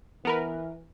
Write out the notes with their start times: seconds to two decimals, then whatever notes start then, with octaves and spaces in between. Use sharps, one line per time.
0.25 E3 B3 A#4 B4